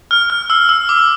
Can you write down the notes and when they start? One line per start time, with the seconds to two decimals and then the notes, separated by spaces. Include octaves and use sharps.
0.11 F6
0.30 F6
0.50 E6
0.69 E6
0.89 D6